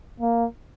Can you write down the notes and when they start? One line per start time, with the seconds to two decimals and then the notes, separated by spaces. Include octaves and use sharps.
0.20 A#3